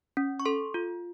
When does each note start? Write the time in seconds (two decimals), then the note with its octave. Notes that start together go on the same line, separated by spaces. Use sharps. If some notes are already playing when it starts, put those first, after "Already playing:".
0.17 C#4
0.40 C#6
0.45 A4 C6
0.74 F4